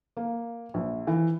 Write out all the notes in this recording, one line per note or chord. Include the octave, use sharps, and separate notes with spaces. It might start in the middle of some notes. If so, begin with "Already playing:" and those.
A#3
A#1
E3